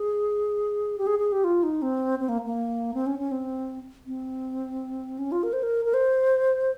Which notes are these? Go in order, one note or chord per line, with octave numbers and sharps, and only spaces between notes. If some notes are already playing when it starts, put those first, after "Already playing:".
Already playing: G#4
G4
G#4
G#4
G4
F4
D#4
C4
C4
A#3
A#3
C4
C#4
C#4
C4
C4
C#4
F4
A#4
C5
A#4
A#4
C5